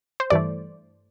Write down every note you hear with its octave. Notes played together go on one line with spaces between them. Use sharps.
C5
G2 E3 A3 D5